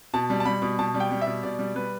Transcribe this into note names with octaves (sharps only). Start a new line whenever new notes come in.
B2 A5
G3
A5
G3 B5
B2
B2 A5
G3
G5
G3
E5
B2
B2 D5
G3
G3 B4